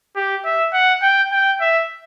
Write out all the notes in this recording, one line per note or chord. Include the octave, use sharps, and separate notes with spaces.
G4
E5
F#5
G5
G5
E5